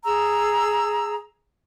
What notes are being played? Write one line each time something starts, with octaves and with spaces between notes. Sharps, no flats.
G#4 A#5 E6